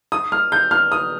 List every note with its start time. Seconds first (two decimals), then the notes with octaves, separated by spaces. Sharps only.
0.12 D#6
0.32 F6
0.52 G6
0.71 F6
0.92 D#6